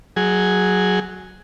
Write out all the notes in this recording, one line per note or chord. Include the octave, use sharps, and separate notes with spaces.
F#3 G#4